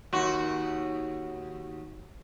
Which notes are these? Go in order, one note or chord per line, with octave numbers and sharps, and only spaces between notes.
D#2 F#4